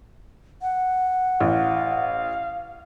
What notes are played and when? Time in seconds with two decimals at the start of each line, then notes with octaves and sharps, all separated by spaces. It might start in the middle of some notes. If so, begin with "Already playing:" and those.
0.62 F#5
1.40 A1 F5